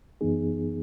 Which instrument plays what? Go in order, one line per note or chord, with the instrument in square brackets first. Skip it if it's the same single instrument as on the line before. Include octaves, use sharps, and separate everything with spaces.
[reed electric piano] F#2 E3 B3 D#4 G#4